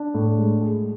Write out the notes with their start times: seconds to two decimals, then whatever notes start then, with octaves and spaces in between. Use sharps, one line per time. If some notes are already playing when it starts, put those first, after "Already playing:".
Already playing: D4
0.14 A2
0.38 G#3
0.62 G#4